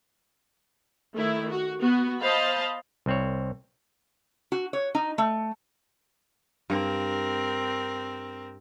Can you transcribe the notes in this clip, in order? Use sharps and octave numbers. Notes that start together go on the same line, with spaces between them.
D#3 A3 E4
F#4
B3 F#4
C5 D#5 F5 A5 B5
C2 C4 C#5
F#4
C#5
D#4
A3
G2 C4 A#4